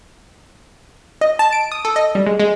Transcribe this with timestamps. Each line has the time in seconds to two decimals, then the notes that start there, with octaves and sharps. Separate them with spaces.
1.21 D#5
1.39 A5
1.53 D7
1.72 D#6
1.85 A4
1.96 D#5
2.15 G3
2.27 G#3
2.40 G#3